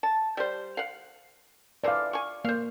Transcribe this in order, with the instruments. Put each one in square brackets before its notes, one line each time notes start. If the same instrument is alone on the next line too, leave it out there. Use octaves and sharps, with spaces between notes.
[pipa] A5
G3 C5
F5 F#5
[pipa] D3 E3 C5 [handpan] D5 F5
[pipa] G#5 C#6
[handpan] A#3 [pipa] C5 F5